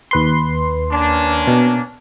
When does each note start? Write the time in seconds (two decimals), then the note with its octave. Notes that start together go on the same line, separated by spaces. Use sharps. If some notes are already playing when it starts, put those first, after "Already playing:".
0.11 D#2 B4 C6
0.92 A#3 C#4 D4
1.47 B2